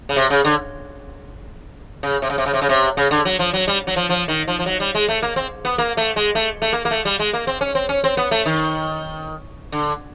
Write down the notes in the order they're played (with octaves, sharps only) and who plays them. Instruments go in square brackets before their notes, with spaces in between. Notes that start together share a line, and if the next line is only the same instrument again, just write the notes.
[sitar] C#3
C3
C#3
D3
C#3
C3
C#3
C3
C#3
C3
C#3
C3
C#3
D3
F#3
F3
F#3
G3
F#3
F3
F3
D#3
F3
F3
F#3
G3
G#3
A3
A#3
C4
B3
A#3
A3
G#3
A3
A3
A#3
A#3
A3
G3
G#3
A#3
C4
C#4
C4
C#4
C4
B3
A3
D#3
D3